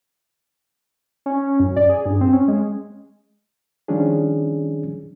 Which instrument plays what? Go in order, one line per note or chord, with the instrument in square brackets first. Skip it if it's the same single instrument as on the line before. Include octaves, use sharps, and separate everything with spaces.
[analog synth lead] C#4
F#2
D5
G#4
G2
C4
C#4
G#3
[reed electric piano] D#3 F3 G3 C#4 D4 G#4